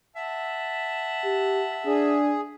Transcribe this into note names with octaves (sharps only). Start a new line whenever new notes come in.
E5 F#5 A5
G4
D4 G#4